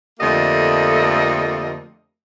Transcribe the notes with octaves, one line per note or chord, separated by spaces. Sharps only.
F2 D3 A3 A#3 G4 D#5